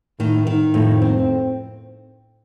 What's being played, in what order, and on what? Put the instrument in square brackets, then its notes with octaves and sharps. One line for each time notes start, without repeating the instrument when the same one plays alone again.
[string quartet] A2 [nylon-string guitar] D#3
[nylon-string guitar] D#3
[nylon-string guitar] F2 [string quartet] A2
[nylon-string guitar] C4